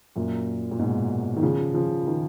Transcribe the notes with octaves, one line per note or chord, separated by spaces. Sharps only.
F#2 A#2
A#2
G#2 B2
D#3
C#3 F3
C#3 F3
D#3